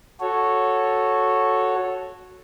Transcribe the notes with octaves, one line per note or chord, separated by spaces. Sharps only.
F#4 A4 C#5